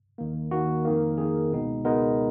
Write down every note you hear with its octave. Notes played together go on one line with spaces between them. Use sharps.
D#2 D#3 A#3
D#2 D#3 A#3 F#4
F2 D#3 A#3
F2 D#3 A#3 G#4
C#2 B2 G#3 B3 D#4
C#2 B2 G#3 B3 D#4 A#4